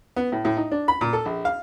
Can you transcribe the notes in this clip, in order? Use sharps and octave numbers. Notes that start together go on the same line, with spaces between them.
B3
A2
A2
D#4
D4
B5
A#2
A4
A#1
F5